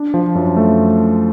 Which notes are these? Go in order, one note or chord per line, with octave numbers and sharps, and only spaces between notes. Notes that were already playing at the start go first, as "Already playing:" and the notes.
Already playing: D4
F3
F#2
A3